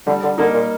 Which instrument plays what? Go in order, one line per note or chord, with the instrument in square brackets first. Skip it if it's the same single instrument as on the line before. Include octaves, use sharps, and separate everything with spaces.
[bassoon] D3 [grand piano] G3
[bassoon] D3
[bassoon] D3 [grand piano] A#3 D#4
[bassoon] A#2